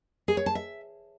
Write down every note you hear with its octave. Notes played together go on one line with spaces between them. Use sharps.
G#4
C#5
A5
E5